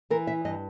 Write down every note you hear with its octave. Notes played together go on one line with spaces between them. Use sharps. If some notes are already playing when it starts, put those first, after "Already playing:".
E3 A#4
E5
G2 D#5